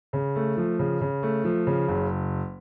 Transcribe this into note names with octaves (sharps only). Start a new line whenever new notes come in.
C#3
A3
F3
C#3
C#3
A3
F3
C#3
F#1